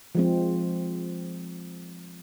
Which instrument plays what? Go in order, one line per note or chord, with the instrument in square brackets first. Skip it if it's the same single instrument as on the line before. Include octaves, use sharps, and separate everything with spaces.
[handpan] F3 G#3 C4